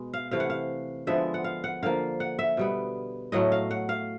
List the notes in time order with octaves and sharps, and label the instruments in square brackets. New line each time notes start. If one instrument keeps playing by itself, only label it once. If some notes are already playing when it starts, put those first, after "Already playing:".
Already playing: [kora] B2 G#3 B3
F5
C3 E3 A3 F5
F#5
F5
D3 F3 G#3 B3 E5
F#5
F5
F#5
D3 F3 A#3 F5
F#5
E5
B2 G3 B3
A2 F#3 A3 D#5
F5
F#5
F5